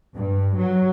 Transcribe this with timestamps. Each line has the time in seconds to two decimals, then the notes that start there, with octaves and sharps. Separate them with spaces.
0.17 G2
0.57 F#3